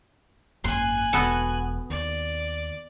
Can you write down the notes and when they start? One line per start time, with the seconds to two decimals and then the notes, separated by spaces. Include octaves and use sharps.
0.64 G#1 F#2 A#3 G#5 C6 F#6
1.13 E1 B3 F#4 A4
1.90 D#2 D5